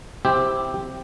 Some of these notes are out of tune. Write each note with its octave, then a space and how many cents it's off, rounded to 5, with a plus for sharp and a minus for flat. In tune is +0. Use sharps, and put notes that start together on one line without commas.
C4 +0 E4 +0 G4 +0